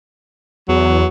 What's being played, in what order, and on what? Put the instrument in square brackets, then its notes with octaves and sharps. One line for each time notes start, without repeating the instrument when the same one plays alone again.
[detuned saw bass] E2 [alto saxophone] F#3